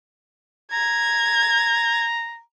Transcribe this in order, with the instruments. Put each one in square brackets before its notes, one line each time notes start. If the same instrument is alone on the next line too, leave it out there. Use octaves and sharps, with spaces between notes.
[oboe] A#5 [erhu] G#6